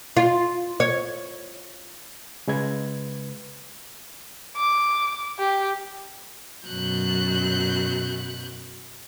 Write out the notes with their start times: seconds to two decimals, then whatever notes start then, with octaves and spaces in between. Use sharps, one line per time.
0.17 F4
0.80 C#5
2.48 C#3 G#3 B4 G#6
4.57 D6
5.39 G4
6.66 F#2 B2 F#3 F#6 G6